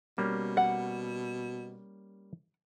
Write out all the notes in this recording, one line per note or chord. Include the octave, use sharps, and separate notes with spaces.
B2 G3 A#3 C#4
F#5